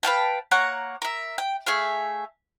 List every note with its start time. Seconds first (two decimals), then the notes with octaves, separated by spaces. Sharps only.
0.03 B4 F5 G5 A5
0.51 A#3 C#5 F#5 A#5
1.02 A#4 E5
1.38 G5
1.66 A3 G#4 E5 F5